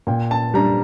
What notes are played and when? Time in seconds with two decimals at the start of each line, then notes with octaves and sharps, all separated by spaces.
0.07 A#2 G5
0.31 A5
0.54 G3 D4 A#5